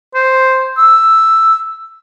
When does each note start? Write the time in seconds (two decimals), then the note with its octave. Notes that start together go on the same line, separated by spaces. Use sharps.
0.15 C5
0.77 E6